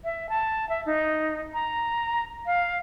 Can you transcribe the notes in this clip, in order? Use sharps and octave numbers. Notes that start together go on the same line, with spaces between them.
E5
A5
E5
D#4
A#5
F5